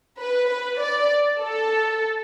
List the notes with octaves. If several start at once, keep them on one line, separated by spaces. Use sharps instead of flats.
B4
B4
D5
A4